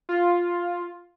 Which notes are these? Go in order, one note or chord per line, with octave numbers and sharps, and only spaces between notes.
F4